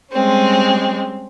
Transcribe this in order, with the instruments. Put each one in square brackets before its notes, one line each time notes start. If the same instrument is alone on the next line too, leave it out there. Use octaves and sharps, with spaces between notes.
[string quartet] G3 G#3 C4 C#4